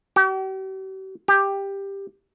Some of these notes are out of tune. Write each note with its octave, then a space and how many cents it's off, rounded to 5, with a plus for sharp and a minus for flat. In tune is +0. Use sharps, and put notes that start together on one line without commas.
G4 -45
G4 +10